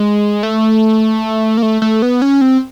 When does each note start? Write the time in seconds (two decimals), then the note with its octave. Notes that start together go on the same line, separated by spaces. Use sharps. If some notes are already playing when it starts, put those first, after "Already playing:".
Already playing: G#3
0.43 A3
1.57 A#3
1.62 A3
1.82 A3
2.02 B3
2.22 C#4
2.41 C4